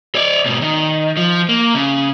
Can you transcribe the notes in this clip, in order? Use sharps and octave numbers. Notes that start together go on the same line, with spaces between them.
C#5 D5
G#2 B2
D#3
F3
A#3
C#3